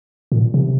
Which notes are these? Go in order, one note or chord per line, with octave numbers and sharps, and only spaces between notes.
A#2
C3